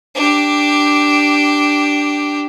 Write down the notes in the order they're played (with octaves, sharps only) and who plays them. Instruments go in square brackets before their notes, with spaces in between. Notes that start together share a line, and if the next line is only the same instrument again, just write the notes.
[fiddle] D4 G4